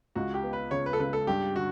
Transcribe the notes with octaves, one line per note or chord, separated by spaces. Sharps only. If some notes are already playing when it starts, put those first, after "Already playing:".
C#2 F#4
G4
B3
B4
C#3 C#5
B4
A4
C#3 B4
A4
G2 G4
D3 F#4